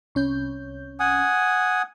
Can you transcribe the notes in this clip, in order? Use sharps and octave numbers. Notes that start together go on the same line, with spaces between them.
C2 C#4 G6
F#5 G#5 D#6